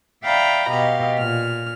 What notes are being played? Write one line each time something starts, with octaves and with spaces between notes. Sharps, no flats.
D5 E5 F5 G5 A#5 B5
B2 G4 D#5 F5
A#2 F6